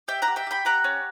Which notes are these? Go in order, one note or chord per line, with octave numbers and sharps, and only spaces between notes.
G4 E5 G5
F#5 A#5
G4
E5 G5
G4 G5 B5
G4 F#5 A#5
C#4